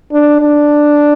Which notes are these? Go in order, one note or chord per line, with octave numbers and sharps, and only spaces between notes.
D4
D4